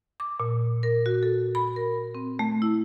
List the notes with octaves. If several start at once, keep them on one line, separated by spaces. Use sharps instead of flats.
D6
A#2
A#4
F#4
A4
B5
A#4
C4
A3
E4